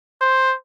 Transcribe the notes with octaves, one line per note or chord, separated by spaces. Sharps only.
C5